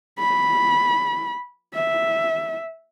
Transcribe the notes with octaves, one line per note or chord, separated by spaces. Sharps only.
B5
E5